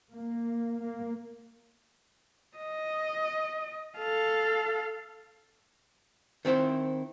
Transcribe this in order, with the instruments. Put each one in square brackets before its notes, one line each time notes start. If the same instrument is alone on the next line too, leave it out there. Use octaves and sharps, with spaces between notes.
[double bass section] A#3
A#3
[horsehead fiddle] D#5
A4 F5
[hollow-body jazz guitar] D#3 C4 E4 C5